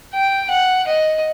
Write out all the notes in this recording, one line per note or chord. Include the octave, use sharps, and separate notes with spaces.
G5
F#5
D#5